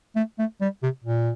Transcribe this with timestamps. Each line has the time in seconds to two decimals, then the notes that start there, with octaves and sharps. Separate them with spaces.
0.16 A3
0.38 A3
0.61 G3
0.82 C3
1.04 A#2